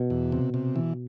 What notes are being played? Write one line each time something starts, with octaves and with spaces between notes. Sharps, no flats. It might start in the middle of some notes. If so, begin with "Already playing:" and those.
Already playing: B2
E2
C3
C3
E3